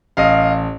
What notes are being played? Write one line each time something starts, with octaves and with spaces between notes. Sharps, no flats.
A1 D#5 F5